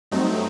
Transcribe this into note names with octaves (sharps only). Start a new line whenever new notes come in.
G2 F#3 A3 C4 D#4